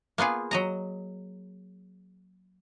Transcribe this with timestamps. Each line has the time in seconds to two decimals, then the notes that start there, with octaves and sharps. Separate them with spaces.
0.18 A#3 B3 F4 G#4
0.51 F#3 D#5 A#5